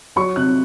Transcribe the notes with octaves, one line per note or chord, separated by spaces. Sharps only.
F#3 C#6
C3 F#6